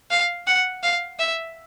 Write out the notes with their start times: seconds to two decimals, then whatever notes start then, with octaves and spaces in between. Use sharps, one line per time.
0.11 F5
0.47 F#5
0.83 F5
1.19 E5